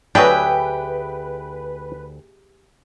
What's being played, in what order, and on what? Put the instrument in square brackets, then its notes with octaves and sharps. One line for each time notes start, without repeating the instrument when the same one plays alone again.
[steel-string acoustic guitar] D2 G5 [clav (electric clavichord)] F#3 D4 [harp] G4 G#4 E5 [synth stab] B4